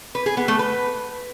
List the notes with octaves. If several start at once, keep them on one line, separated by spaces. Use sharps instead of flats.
B4
G#4
B3
A3
B4